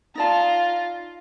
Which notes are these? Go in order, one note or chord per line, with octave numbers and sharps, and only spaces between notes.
D#4 F4 D5 A5 A#5